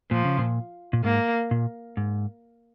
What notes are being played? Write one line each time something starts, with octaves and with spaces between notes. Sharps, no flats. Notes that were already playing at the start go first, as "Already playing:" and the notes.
A#2 F3
C#3
A#2
A#2
G#2 A#3
A#2
G#2